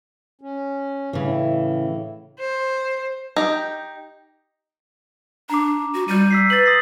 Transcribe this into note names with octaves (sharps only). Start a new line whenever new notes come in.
C#4
A2 C#3 E3
C5
D#4 G4
D4 A#5 D6
F#4
G3 G6 D#7
E6 B6 C7
B4 A6 F#7
D#6 A#6 C7